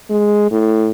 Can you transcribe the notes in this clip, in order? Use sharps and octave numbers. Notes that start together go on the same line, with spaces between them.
G#3
A2